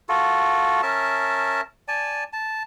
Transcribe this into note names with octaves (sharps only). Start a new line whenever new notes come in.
F4 F#4 A4
C#4 A#4 E5 A5
D5 G#5 A5
A5